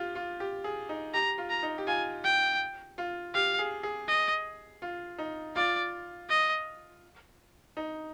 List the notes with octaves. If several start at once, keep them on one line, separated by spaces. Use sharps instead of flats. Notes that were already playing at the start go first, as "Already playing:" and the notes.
Already playing: F4 G4
F4
G4
G#4
D#4
G4 A#5
F4
A#5
D#4
G4
F4 G#5
G5
F4
G4 F5
G#4
G#4
D#5
F4
D#4
F4 D5
D#5
D#4